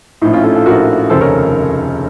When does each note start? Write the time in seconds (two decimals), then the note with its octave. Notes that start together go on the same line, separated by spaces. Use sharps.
0.22 A2 D#4
0.25 A#1
0.33 C#4 F4
0.43 F4 A4
0.55 F4 A4
0.65 A#1 A2 F#4 A#4
1.10 F1 D#2 C#3 A4 C5
1.20 A#4 C#5